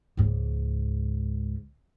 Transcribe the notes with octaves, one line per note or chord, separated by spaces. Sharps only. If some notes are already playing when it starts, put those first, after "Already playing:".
C#2 G#2